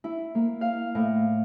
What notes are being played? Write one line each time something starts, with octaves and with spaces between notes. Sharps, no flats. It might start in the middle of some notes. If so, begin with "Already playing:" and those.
E4
A#3
F5
A2